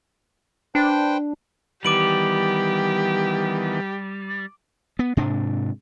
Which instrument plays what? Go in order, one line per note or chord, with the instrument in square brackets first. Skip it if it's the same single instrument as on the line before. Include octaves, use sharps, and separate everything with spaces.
[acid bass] D4 [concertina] B4 C5 G5
[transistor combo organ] D#3 E3 B3 [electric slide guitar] G3 [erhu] G4 [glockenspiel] D6 D7 F#7
[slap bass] B3
G#2 C3 D4